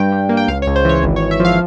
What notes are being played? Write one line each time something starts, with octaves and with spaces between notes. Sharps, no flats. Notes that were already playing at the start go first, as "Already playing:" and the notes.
Already playing: G2 G5
G2
A#3
G5
C#2 F5
C#2 C#5
C5
E3 C#5
G#1
C#5
G#1
E5
F3 F5